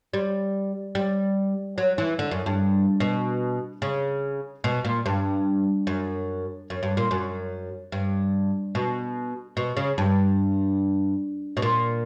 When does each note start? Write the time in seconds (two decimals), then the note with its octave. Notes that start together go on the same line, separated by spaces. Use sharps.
0.14 G3
0.95 G3
1.78 F#3
1.98 E3
2.19 D3
2.31 F#2
2.46 G2
3.00 B2
3.82 C#3
4.64 B2
4.85 A#2
5.06 G2
5.87 F#2
6.70 F#2
6.83 G2
6.97 A#2
7.11 F#2
7.92 G2
8.75 B2
9.57 B2
9.77 C#3
9.98 G2
11.57 B2
11.62 A#2